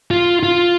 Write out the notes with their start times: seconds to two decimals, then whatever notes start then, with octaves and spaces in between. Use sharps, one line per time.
0.11 F4
0.43 F4